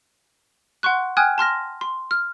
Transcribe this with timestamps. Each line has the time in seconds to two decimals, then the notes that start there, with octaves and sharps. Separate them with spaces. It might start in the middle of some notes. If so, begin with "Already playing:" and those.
0.83 F#5 C6 C#6 F#6
1.17 G5 G#5 D#6 F6 F#6 G#6
1.38 A5 C6 F6 A#6
1.81 C6
2.11 F6